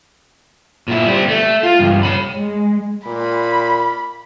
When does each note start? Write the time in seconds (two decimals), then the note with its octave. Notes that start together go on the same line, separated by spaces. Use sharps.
0.88 A#2 E4
1.06 G3 C4
1.29 A3
1.63 F4
1.79 C#2 G2
2.03 C#5 B5
2.38 G#3
3.06 A#2 B5